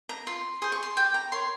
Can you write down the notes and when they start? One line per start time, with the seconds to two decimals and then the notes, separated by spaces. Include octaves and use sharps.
0.09 A#5
0.27 F4 C6
0.62 G#4 C5 C6
0.72 C#6
0.83 C6
0.97 G4 G5
1.14 A#5
1.32 A#4 C#5 C6